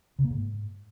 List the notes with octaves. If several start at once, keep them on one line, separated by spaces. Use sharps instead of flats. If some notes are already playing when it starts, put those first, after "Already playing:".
C#3
A#3
G#2